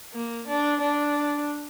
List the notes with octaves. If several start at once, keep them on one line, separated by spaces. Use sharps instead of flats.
A#3
D4
D4